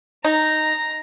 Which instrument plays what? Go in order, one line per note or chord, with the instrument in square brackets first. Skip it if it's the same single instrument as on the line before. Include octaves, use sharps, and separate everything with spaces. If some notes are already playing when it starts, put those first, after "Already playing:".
[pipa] D#4 [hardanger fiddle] A#5